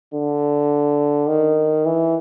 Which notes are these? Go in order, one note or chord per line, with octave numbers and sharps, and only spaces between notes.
D3
D#3
E3